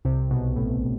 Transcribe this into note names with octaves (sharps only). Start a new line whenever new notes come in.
C2 C3
B1 B2
A1 A2